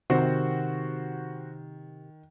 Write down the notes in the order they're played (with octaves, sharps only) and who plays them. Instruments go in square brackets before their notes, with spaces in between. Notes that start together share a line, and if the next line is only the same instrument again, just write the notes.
[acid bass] C3 [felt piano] D#3 [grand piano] C4 F#4 C5